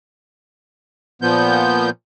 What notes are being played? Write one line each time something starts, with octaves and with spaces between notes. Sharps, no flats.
A#2 F3 B3 G6